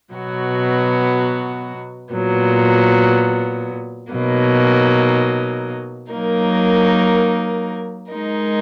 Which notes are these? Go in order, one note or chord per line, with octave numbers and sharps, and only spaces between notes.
B2 F#3 B3 F#4
A#2 F#3 B3
B2 F#3 A#3 D#4
F#3 A#3 D#4 A#4
G#3 D#4 A#4